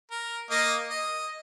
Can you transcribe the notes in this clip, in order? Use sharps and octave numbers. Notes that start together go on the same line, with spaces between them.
A#4
A#3 D#5
D#5